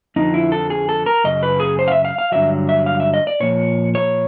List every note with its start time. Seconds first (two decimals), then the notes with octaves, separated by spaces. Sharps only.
0.16 F2 D3 F3 D#4
0.34 E4
0.52 A4
0.70 G#4
0.89 A4
1.06 A#4
1.24 F#2 C#3 D#5
1.43 B4
1.60 G#4
1.79 C5
1.88 F5
1.92 E5
2.05 F5
2.18 F5
2.32 G2 D3 F#3 E5
2.69 E5
2.86 F5
3.00 E5
3.14 D#5
3.27 D5
3.40 A#2 F3 C#5
3.95 C#5